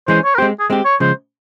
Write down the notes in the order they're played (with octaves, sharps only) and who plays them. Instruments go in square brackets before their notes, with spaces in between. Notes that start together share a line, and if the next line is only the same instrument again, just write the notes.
[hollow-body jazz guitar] E3 G#3 C#4 [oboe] C5
[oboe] C#5
A#4
[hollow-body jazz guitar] G#3 C4 G4 [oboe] C5
[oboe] G#4
[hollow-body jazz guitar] G#3 C4 G4
[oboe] C#5
[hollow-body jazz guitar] C#3 F3 G#3 [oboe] C5